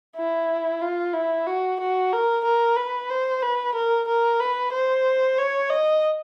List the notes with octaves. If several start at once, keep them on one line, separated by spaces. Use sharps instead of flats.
E4
F4
E4
F#4
F#4
A#4
A#4
B4
C5
B4
A#4
A#4
B4
C5
C#5
D#5